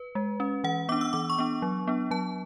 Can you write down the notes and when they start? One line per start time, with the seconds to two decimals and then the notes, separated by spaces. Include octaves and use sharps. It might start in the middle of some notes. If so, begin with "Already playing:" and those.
Already playing: B4
0.15 G#3
0.40 C#4
0.64 E3 F#5
0.89 B3 D4 D6
1.01 E6
1.13 E3 D6
1.30 C#6
1.38 B3 D4
1.62 F#3
1.87 B3 D4
2.11 F#3 A5